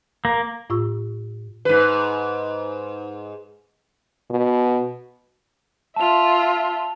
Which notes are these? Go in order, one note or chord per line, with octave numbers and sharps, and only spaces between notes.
A#3
A2 F4 C#6 E6
G#2 B4
B2
F4 E5 A5 F7